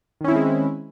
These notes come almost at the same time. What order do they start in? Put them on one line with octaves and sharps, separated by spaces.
D#3 C#4 E4 C4 G#3